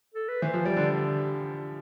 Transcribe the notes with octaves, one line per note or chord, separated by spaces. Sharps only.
A4
B4
E3 C5
F3
G3 D5
D3